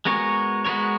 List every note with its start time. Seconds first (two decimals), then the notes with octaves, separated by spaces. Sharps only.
0.05 G#3 B3 F#4 A#4 C#5
0.65 G#3 B3 F#4 A#4 C#5